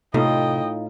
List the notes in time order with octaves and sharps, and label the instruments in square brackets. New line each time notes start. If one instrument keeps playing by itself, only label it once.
[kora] A2 [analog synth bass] C3 [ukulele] D#4 F4 [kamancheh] D#5 G5